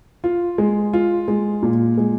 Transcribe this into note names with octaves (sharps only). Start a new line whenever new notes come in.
F4
G#3
F4
G#3
A#2
G#3